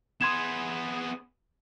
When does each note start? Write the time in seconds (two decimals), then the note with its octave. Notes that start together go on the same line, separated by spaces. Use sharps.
0.21 B3 G#4 C6 G#6 E7